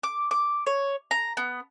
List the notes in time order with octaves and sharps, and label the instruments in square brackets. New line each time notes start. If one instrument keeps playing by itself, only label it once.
[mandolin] D6
D6
C#5
A#5
B3